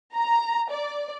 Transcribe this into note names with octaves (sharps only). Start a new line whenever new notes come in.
A#5
D5